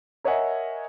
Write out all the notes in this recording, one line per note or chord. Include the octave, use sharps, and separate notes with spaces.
A#4 C#5 D#5 E5 F#5 G#5